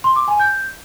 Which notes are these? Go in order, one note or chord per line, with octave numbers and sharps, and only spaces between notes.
C6
D6
G#5
G6